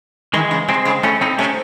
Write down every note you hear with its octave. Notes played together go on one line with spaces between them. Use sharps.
D#3 E3 G#3
C#3
C3 G#3 C4
C#3
A2 A3 C#4
A2 C4 D#4
C3 A3 C#4